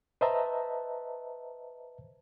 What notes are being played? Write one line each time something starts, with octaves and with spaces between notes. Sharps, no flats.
B4 C5 D#5 E5 A5 A#5